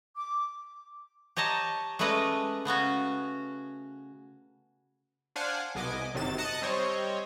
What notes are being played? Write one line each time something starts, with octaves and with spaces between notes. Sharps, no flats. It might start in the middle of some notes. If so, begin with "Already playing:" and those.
D6
G4 C#5 D#5 A5 A#5
G#3 A3 C#4 B4 D5 D#5
C#3 B3 C#4 F#4
D4 C5 F5 F#5 G#5
C2 B3 D#5 G#5 D6
G1 C3 D#3 F#3 A6 E7
D#5 A5 D#6 F#6 C#7
G3 C4 C5 C#5 D#5